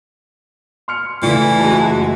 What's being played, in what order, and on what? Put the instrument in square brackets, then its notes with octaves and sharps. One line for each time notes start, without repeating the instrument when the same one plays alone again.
[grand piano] C6 F6 C#7
[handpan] C#3 A3 F4 [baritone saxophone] E3 [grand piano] D5
[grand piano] F#1 A5 [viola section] G#3 F#4